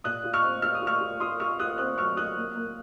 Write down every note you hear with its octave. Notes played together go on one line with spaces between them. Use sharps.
A#2 D#6 F#6
F4
C#6 F6
C4
F4 F6
D#6
F4
C#6 F6
F4
F4 C6 D#6
F4 C#6 F6
F4 D#6 F#6
C4 D#6 F#6
F#3 C#6 F6
F4 D#6 F#6
A#3
A#3